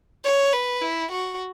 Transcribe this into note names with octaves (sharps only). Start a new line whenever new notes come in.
C#5
B4
E4
F#4